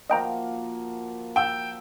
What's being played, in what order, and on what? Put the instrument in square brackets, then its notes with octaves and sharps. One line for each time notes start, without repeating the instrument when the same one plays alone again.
[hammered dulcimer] F3 A#3 F#4 [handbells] D#5 G5 A#5
[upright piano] G5 E6